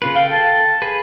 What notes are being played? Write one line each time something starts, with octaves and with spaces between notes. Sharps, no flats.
C#3 F4 B4
A4 F5 G5
A5
G#4 B4